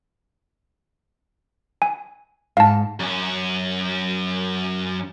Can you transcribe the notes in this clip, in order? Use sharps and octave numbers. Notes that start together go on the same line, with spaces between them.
G#5
G#2 F5 A5
F#2 C#4